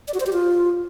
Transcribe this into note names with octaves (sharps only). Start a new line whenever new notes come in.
D5
F#4
C5
G4
F4